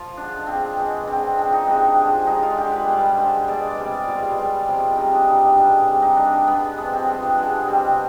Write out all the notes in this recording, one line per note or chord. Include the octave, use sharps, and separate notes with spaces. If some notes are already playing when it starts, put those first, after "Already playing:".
Already playing: F3 F4
D3 G#3 D4
D3 G#3 C4
B2 G#3
D3 G#3 C4
D3 F3 G#3 C4
D#4
C3 D#3 G#3 D4
D3 F3 G#3
D3 G#3 D#4
F4
D3 G#3 G4
B4
B2
G3
D3 G#3 C5
B2 G#3 D5
C3 G3 D5
B2 G#3 F4
B2 G3
C3 F3 G#3
C3 G3 D#4
D4
B2 G3 D#4
B2 G#3 D4
C3 G3
D#4
D3 G3 D4
D4
D3 G#3 B3
C3 F3 G#3 B3
C4
C3 F3 G#3 B3
D4
D3 F3 G#3 B3
B2 G3 C4